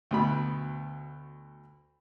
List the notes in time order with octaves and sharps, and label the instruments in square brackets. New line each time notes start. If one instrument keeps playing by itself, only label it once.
[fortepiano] D2 B2 B5